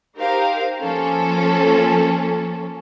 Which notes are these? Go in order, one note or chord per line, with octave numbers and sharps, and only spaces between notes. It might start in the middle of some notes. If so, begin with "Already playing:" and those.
D#4 G4 A#4 C5 F5
F3 A#3 C#4 A4